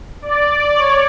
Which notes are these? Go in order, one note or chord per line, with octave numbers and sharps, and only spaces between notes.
D5
C#5